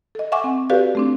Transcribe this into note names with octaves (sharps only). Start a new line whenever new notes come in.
A4 D#5
E5 F#5 G#5 C#6 D6
C4
F#4 G4 A4 B4 D5 F5
A3 C4 D4